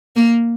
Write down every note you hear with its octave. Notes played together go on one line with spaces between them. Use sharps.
A#3